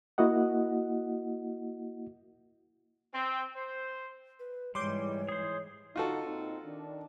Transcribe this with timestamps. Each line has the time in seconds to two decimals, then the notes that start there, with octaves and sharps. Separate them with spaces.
0.18 A#3 E4 F#4 D#5 F#5
3.14 C4
3.56 C5
4.39 B4
4.75 G#2 E3 G3 G#3 C#5 C6 D6 G6
5.29 G#4 C5
5.96 D3 D#4 F4 F#4 A4
6.26 A#2 C4 D#4
6.65 D#3 D4